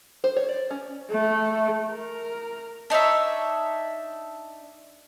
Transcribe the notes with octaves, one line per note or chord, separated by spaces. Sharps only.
C5
C#5
D5
C#4
A3
A#4
D4 D#4 C#5 E5